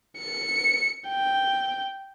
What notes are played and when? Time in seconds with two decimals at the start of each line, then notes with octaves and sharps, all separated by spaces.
0.19 C#7
1.09 G5